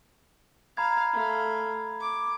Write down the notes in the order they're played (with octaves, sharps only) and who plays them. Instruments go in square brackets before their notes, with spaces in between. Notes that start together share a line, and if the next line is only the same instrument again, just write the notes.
[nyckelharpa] F5 [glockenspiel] A#5 B5 G#6
[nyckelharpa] A3 F5
D6